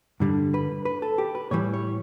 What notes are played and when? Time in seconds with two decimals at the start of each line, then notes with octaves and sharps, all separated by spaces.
0.20 G2 D3 G3
0.54 B4
0.85 B4
1.02 A4
1.18 G4
1.35 B4
1.51 A2 E3 G3 C#5
1.74 C#5